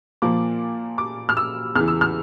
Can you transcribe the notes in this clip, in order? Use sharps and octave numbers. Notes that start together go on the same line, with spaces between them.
A#2 F3 A#3 D6
D6
F6
E6
E2 C#3 E3 F6
E6
F6